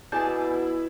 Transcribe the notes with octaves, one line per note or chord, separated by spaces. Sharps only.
B2 E4 G#4 D5 G#5 A5 G6